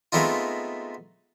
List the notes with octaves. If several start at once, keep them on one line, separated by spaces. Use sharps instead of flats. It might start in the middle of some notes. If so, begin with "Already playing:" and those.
G#3 A3 B3 C4 D#4 F4